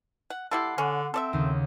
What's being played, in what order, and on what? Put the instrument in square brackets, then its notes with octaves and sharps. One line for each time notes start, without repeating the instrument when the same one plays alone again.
[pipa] F#5
[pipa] G3 E4 A4 [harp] F#5 C6 D6
[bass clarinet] D3 [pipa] C#4
[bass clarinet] C4 [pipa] A4 D5 E5
[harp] D#2 C#3